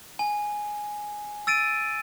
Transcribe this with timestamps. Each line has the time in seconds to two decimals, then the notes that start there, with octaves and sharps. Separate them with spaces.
0.19 G#5
1.47 E6 A6 D7 D#7